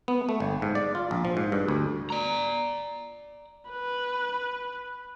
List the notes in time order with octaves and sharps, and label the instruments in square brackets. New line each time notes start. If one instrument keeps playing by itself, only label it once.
[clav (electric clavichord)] B3
A3
G1
G#2
D5
F4
A#1
F3
G#2
G2
D2
[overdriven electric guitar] D5 A#5
[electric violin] B4